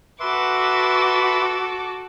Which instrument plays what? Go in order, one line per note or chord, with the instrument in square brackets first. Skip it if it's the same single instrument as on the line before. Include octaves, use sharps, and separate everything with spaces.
[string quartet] F#4 A4 D6 [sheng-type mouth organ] B4 E5 C6